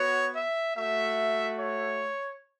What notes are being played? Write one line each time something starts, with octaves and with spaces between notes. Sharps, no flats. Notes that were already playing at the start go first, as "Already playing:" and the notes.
Already playing: B3 F#4 C#5
E5
A3 F#4 E5
C#5